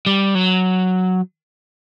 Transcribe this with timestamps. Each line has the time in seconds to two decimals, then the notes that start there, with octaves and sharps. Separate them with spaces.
0.06 G3
0.35 F#3